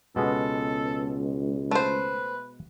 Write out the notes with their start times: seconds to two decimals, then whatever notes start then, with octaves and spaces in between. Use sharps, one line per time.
0.16 C#2 B2 G#3 B3 A4
1.71 A3 B4 C5